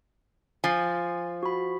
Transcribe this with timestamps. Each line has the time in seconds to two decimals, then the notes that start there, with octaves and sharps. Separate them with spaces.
0.64 F3 G#5 A6 C7
1.43 F#4 B5